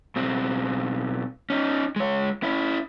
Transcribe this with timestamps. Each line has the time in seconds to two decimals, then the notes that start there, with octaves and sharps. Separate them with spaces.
0.16 B1 C4
1.50 C#4 D#4
1.96 G#3 C#5
2.43 C#4 E4